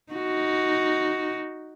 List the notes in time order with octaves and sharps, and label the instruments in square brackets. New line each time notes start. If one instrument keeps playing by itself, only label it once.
[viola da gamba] D#4 F#4